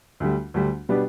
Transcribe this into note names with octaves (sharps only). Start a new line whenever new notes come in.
D2 D3 G3
D2 D3 G3
B2 G3 B3 D4 G4